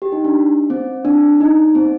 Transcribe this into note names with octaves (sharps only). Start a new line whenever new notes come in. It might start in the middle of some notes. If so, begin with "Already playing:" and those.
G4
D#4
D4
C4
D4
D#4
C4